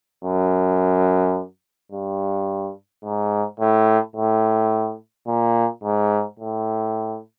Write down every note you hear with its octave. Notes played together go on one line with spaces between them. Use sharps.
F#2
G2
G#2
A2
A2
A#2
G#2
A2